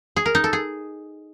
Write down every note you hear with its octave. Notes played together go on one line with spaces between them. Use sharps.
G#4
A#4
D#4
A4
G#4